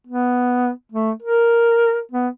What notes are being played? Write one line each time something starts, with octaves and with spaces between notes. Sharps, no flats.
B3
A3
A#4
B3